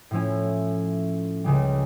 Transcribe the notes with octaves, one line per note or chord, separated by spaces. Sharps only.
A2 F3 C#4 E4
C#2 C#3 G3